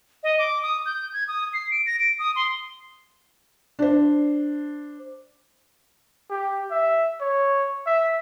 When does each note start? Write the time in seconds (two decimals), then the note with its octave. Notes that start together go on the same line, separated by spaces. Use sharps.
0.23 D#5
0.38 D6
0.62 D#6
0.86 G6
1.13 G#6
1.28 D#6
1.53 C7
1.71 D7
1.86 A#6
2.00 D7
2.19 D#6
2.36 C6
3.79 D4 C5
6.30 G4
6.71 E5
7.21 C#5
7.86 E5